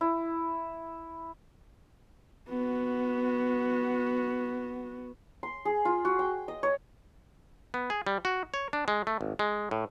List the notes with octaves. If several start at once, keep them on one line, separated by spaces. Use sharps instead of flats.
E4
B3 F#4
C6
G#4
F4
F#4
G5
D#5
C#5
B3
G#4
G3
F#4
C#5
D4
G#3
A3
G#1
G#3
A2